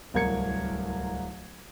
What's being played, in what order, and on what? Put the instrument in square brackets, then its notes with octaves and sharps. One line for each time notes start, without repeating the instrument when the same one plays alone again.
[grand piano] D1 C2 A#4 G#6 C#7